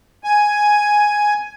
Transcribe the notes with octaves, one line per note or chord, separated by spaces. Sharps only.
G#5